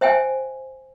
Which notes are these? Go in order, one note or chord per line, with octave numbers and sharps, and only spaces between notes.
C5 E5 G5 G#5